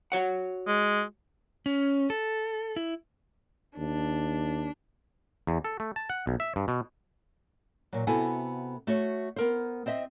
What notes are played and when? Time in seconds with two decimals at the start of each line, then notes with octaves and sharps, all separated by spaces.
0.12 F#4 C#5 F#5
0.67 G#3
1.66 C#4
2.10 A4
2.76 E4
3.78 D#2 D4
5.47 E2
5.64 A4
5.80 A3
5.96 A5
6.10 F#5
6.27 B1
6.40 E5
6.56 G2
6.68 B2
7.93 A#2 F#3
8.07 C3 B3 E4 F#4 A4 G#5
8.87 A3 F#4 C#5
9.36 B3 A#4 C5
9.86 C4 C5 D#5 E5